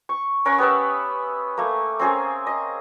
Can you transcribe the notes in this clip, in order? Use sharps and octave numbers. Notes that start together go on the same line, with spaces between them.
C#6
C#4 A#4 F#5 C#6
B3 G4 B4 E5
A3 A#3
C4 C#4 G#4 A#4
D#5